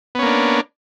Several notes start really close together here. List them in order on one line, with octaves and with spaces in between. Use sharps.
B3 C#4 A#3 D4